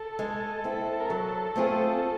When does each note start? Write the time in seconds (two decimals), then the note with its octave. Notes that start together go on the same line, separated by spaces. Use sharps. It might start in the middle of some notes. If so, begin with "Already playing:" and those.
Already playing: A4
0.19 G#3
0.64 C4 E4
1.00 A#4
1.10 F#3 A4
1.56 A3 C4 F4 G#4